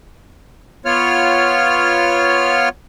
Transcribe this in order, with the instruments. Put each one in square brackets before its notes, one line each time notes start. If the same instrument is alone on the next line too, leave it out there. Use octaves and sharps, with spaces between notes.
[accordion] B3 F4 C#5 F6